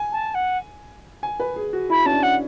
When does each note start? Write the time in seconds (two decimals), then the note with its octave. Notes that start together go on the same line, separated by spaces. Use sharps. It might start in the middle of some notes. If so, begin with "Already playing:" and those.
Already playing: G#5
0.12 A5
0.34 F#5
1.23 G#5
1.40 B4
1.56 G#4
1.73 F#4
1.90 E4 B5
2.06 C#4 A5
2.12 D4
2.23 F#5